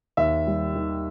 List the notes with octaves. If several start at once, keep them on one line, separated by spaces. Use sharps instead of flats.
D#2 E5
G3
D#3